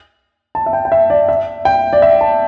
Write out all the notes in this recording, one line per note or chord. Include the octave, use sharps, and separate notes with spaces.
A5
E5
G5
G5
E5
D5
E5
G5
D5
E5
A5